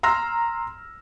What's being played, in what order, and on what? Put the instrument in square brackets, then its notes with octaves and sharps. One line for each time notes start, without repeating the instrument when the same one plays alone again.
[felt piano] A#5 C6 E6 F6 A#6